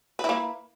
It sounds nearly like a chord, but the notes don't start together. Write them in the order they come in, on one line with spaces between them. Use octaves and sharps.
B4 E4 A#3